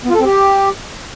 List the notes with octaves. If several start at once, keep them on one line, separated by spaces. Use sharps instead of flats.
B3
F4
A4
C4
G4